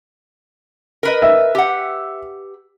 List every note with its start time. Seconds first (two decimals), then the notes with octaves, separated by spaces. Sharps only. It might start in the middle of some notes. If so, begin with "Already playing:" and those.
1.03 A#4 B4 D#5
1.22 E5
1.55 G4 F#5